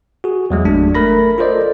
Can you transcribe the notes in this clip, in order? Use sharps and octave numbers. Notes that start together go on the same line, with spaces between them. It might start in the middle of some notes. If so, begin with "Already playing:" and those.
F#4 G#4
E2 F#3 G#3
G1 A3 D4
A3 A#4 B5 A#6
F4 A4 A#4 C5 D5 D#5